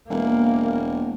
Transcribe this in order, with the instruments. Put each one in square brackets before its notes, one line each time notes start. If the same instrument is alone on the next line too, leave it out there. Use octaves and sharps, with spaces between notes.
[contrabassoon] E1 [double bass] A#3